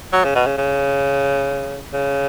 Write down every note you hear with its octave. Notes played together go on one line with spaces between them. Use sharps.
F#3
C#3
B2
C#3
C#3
C#3